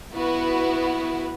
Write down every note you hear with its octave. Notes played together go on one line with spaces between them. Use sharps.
B3 E4 F#4 B4